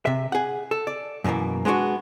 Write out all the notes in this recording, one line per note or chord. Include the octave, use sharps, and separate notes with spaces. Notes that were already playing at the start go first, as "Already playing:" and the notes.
C3 E5
G#4 F#5
A4
D5
F#2 B2 D3 E3 A#3
G#3 B3 D4 F4 F#4